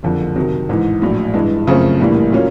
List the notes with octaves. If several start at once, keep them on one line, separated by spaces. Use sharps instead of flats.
F#1 F2 D3
C3 D#3 F#3
A1 G#2 E3
A#1 A2 F#3
G2 E3 G#3
F#2 C#3 F3 A3 C4
A#1 A2 E3 G3 A#3
A#2 F#3 A#3 C#4